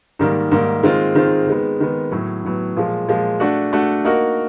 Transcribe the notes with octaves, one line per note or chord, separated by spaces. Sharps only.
G#2 D#3 G3 A#3
G#2 D#3 G3 A#3
D#3 G#3 C4 F4
D#3 G#3 C4 F4
D#3 G#3 B3
D#3 G#3 B3
A2 F#3 B3
A2 F#3 B3
A#2 F3 G#3
A#2 F3 G#3
A3 D4 F#4
A3 D4 F#4
A#3 D#4 F#4 A#4